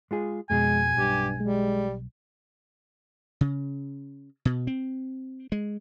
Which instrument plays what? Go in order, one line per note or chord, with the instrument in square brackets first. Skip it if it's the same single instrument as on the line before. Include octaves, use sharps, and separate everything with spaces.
[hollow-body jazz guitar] G#3 F4 G#4
[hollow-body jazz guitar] F2 B2 G#4 [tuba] G#3 [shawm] G#5
[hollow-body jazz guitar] B1 [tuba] G2 [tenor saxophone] G4
[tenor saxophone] G3 [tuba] G#3
[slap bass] C#3
B2
C4
G#3